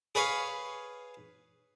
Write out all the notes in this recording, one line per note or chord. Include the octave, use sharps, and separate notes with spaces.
G#4 B4 C#5 F5